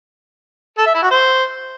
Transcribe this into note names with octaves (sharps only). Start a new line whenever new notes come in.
A4
E5
E4
F#4
C5